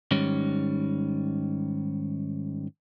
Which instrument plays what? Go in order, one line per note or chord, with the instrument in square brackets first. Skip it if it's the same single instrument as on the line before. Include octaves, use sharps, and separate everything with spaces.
[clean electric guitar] G#2 D#3 G3 C#4